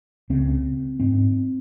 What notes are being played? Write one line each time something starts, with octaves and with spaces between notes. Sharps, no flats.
C#2 C#3 C4
G#2 C4